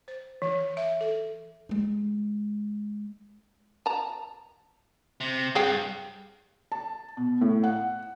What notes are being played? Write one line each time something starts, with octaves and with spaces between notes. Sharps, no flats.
C5
E3
E5
A4
G#3 D#4
A5 A#5
C3
G2 G#4 F5 G5
A5
B2
A2
F#5